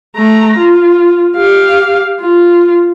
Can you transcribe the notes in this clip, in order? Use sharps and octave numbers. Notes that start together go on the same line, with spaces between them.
A3 A#5
F4
G4 F5
F4